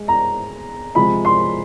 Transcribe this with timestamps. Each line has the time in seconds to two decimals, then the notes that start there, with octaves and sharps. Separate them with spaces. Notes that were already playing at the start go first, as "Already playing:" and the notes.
Already playing: G#3
0.08 A#5
0.95 C3 F3 G#3 B5
1.25 C6